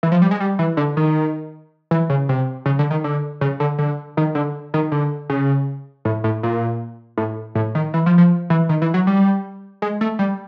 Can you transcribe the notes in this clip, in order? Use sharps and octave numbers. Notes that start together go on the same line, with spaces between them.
E3
F3
G3
G#3
G3
E3
D3
D#3
E3
C#3
C3
C#3
D3
D#3
D3
C#3
D3
D3
D#3
D3
D#3
D3
C#3
A2
A2
A#2
A2
A2
D#3
E3
F3
F3
E3
D#3
E3
F#3
G3
G#3
A3
G3